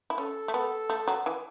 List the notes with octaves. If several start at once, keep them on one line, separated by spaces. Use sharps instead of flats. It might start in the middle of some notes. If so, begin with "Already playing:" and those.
E4
C#4 A4
A3
B3 A4
A3
F#3
E3